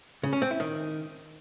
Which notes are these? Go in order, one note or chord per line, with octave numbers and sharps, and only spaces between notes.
C#3
C#4
C4
E4
D#3